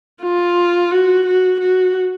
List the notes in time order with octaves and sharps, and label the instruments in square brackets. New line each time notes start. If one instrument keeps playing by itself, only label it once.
[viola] F4
F#4
F#4
F#4